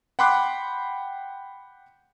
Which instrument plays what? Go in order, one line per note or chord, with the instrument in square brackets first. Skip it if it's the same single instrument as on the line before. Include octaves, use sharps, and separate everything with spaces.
[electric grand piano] F#5 G5 B5 C6 D6 F#6